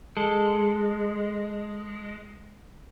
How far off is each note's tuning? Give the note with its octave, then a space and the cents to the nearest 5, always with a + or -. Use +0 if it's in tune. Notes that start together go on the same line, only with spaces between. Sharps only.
G#3 +0 A4 +0